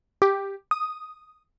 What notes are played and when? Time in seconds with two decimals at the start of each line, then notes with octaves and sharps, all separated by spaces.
0.22 G4
0.71 D#6